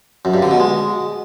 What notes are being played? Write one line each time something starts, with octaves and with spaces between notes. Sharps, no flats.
F#2
G2
D3
B2
G#3